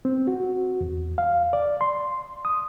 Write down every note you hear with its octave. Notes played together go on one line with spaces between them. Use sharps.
C4
F#4
E2
F5
D5
C6
D#6